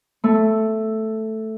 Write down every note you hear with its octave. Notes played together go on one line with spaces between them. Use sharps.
A3